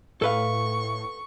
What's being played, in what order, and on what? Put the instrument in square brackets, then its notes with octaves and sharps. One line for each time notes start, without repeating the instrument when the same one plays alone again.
[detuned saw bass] A2 [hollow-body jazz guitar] A4 B4 F5 [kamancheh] C#6